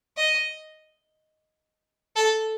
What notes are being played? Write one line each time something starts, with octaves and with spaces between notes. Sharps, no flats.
D#5
A4